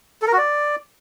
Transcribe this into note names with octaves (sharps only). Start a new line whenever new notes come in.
A4
A#4
F#4
D5